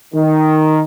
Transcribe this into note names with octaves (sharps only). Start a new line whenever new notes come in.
D#3